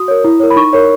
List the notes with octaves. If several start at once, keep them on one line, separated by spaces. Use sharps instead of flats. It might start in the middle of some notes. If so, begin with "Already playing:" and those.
Already playing: F#4 D#6
A#4 C#5
E4
A#4 C#5
B5
D#4 C#6
A#4 C#5